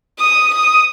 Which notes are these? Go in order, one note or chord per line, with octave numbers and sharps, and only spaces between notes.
D#6
D#6